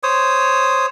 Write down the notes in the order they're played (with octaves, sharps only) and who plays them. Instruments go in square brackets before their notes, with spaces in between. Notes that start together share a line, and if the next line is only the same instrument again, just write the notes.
[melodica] C5 C#5 D#6